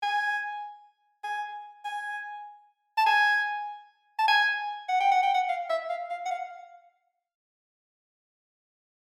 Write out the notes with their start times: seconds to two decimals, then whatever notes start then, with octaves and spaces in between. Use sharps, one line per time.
0.03 G#5
1.24 G#5
1.85 G#5
2.97 A5
3.06 G#5
4.18 A5
4.28 G#5
4.89 F#5
5.00 G5
5.11 F#5
5.23 G5
5.34 F#5
5.49 F5
5.70 E5
5.89 F5
6.10 F5
6.25 F#5
6.30 F5